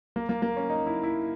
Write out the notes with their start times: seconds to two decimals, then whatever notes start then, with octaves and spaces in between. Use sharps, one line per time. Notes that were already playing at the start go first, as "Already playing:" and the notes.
0.16 A#3
0.29 A#3
0.42 A#3
0.57 C#4
0.70 D#4
0.86 E4
1.03 E4